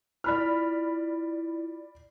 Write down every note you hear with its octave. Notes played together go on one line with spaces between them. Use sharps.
E4 F4 D5 B5 F6